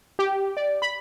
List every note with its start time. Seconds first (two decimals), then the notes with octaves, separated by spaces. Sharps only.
0.19 G4
0.57 D5
0.82 B5